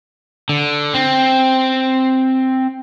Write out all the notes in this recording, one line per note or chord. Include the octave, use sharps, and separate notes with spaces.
D3
C4